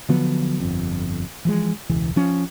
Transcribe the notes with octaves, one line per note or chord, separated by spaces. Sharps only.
D3 F3 F#3 B3
G1 F2
E3 F3 G#3
E1 C#2 E3
F3 C#4